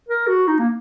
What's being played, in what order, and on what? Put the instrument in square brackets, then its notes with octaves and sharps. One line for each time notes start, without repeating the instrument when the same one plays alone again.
[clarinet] A#4
F#4
D#4
A#3